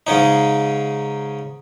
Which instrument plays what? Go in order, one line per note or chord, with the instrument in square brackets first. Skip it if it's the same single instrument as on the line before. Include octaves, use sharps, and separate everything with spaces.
[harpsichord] G#2 C#3 C#4 D#4